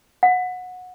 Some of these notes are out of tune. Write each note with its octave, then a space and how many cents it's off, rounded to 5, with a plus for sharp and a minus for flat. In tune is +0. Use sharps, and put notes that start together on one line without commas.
F#5 -20